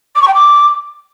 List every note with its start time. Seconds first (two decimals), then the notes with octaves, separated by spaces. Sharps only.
0.15 D6
0.21 C#6
0.28 G5
0.34 D6